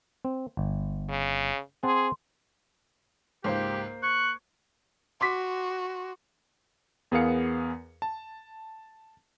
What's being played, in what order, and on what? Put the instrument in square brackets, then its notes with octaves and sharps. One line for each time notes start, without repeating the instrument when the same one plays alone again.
[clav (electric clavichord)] C4
G1
[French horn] C#3
[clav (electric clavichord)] C4 F#5 A5 [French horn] G#4 [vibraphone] C6
[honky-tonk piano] C#2 G#2 [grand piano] A#3 C5 [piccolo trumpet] G4
[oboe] C#6 [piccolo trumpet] F#6 [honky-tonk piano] G#6
[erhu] F#4 [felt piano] C6 D6 B6
[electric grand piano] E2 B3 G#4 A#4 F5 C#7
A5